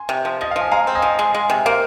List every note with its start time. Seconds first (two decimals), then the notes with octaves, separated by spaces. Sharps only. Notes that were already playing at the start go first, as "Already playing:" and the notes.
Already playing: G#5 C6
0.09 C3
0.25 F3
0.41 F3 D#5
0.51 F3 F5
0.61 G#5
0.71 G#3 F5 A#5
0.87 C4
0.95 D#5 G#5
1.02 F3
1.19 G#3
1.35 G#3
1.50 C3
1.65 A#3 C5 F5